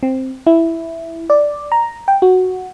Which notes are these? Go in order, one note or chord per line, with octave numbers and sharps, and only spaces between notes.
C4
E4
D5
A#5
G5
F#4